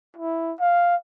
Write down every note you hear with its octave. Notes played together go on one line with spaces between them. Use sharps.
E4
F5